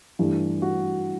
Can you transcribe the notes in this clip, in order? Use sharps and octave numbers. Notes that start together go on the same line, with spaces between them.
G2 E3 A3
F#4